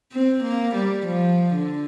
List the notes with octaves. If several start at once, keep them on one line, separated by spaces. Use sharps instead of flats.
C4
A#3
G3
F3
D3